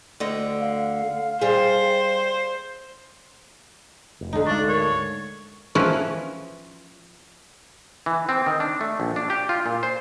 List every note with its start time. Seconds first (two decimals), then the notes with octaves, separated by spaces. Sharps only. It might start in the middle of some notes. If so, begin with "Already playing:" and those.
0.20 D2 D3 D#5
0.60 F5
1.41 G3 G#4 C5
4.21 F1
4.33 D2 G#2 D3 D#4
4.47 G#3 D4 C#6
4.68 A#4 C#5
5.75 E3 F3 C#4 E4 A#4 B4
8.06 E3
8.29 C4
8.46 D#3
8.60 D4
8.81 A3
9.00 A#1
9.16 D4
9.30 G4
9.49 F4
9.66 A#2
9.83 C5